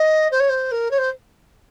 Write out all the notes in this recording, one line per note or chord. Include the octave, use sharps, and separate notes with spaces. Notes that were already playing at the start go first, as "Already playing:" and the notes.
Already playing: D#5
C5
C#5
C5
A#4
C#5
C5